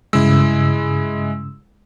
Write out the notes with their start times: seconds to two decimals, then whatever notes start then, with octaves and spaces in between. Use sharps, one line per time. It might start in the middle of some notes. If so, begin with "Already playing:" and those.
0.13 G2 C#3 G#3 E4 E6